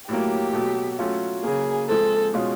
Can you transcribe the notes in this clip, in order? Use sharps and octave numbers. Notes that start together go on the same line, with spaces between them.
A2 F#3 A#3 G4
B2 F#3 A3
F#3 A3 C#4 F4
C#3 F#3 A#3 G#4
F3 G#3 C4 A4
B2 G#3 C#4 F4